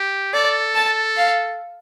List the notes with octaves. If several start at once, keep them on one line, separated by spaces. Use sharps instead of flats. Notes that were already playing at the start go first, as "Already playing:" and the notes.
Already playing: G4
A4 D5
A5
F5